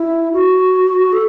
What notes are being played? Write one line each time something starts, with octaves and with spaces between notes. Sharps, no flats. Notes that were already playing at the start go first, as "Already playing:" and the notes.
Already playing: E4
F#4
A4